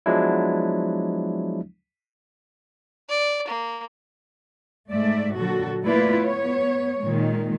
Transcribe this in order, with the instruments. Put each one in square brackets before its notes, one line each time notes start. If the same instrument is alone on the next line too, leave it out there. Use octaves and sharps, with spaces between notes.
[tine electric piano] F3 F#3 G#3 B3 D4 E4
[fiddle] D5
A#3
[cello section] G#2 A3 D5 E5
A#2 D3 F#3 F#4 A4
A3 A#3 E4 F4 B4 D5
B3 C#5
A#2 D#3 G#3